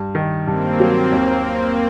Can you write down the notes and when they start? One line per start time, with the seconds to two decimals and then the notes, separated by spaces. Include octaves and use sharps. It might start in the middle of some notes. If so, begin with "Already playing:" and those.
Already playing: G2
0.15 D#3
0.47 G2 A#3 C4
0.80 F#3
1.12 D#2 A#3 C4